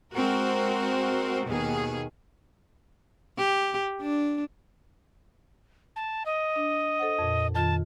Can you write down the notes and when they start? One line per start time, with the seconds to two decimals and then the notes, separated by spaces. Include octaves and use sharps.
0.14 G#3 C4 F#4 A#4
1.48 D#2 B2 D#3 G#4
3.38 G4
4.01 D4
5.96 A5
6.26 D#5
6.56 D4
6.99 A4 C5 F#5
7.19 F2 A#2
7.55 F2 D#3 F4 A5